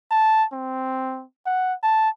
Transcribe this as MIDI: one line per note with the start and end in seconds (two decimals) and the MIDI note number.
0.11 0.45 81
0.53 1.24 60
1.46 1.74 78
1.83 2.10 81